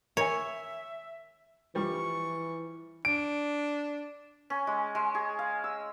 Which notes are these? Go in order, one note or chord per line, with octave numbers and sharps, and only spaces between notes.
A#4 C#5 E5 G#5
E3 F3 G3 C#6
D4 D7
C#4
G#3
G#3
G#4
F5
E6